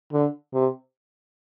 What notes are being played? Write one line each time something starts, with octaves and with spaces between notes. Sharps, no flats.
D3
C3